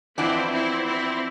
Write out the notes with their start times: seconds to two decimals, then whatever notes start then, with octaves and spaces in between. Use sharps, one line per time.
0.17 F2 E3 B3 C4 D4 E4
0.52 C4 E4
0.87 C4 E4